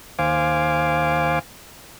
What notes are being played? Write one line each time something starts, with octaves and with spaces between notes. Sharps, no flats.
D#2 C5 F5 G#5 D6